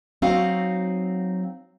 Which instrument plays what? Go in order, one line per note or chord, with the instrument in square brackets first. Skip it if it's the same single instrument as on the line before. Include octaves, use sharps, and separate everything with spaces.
[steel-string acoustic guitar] F#3 C4 D#4 F#4 F5